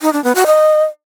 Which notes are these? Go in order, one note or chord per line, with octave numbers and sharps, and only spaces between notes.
D#4
D4
B3
F#4
D#5